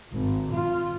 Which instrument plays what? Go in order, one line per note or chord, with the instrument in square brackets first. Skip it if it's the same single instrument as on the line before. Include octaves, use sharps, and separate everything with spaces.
[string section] G#1
F4